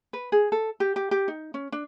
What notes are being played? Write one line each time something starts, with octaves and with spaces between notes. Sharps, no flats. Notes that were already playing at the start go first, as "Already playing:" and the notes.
B4
G#4
A4
G4
G4
G4
D#4
C#4
D4